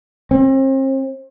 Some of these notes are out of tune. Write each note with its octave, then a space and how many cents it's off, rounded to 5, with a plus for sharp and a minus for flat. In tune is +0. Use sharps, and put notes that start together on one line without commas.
C4 +40